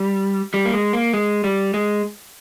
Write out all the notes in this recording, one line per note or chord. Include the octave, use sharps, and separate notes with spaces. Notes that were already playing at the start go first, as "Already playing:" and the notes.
Already playing: G3
G3
A#3
G#3
A#3
G#3
G3
G#3